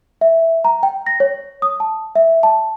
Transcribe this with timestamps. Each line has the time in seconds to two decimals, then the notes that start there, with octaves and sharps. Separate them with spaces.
0.21 E5
0.65 A#5
0.83 G5
1.06 A#6
1.20 C#5
1.62 D#6
1.80 A5
2.15 E5
2.43 A5